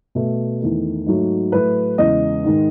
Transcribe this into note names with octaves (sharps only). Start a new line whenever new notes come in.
B2 A3
E2 D#3 A3
G#2 F#3 A3
A2 F#3 A3 B4
E2 C#3 G#3 D#5
G#2 D#3 G#3